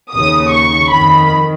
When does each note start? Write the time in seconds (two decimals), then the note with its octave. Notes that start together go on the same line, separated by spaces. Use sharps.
0.13 D#2 C#3 D#6
0.51 C#6
0.90 F2 D#3 B5